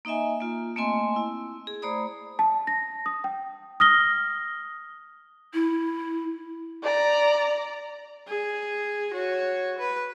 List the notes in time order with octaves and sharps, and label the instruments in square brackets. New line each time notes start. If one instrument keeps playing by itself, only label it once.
[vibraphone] A#3 D#4 D#5 E5 G#5
A#3 F4
A3 A#3 C4 D#5 G#5 C6
E4
G#4
A3 C5 D5 A#5 B5 D#6
[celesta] A5
A#6
D#6
G5
D#6 F6 A#6 G7
[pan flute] E4
[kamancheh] D5 A#5
[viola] G#4
F#4 C#5
B4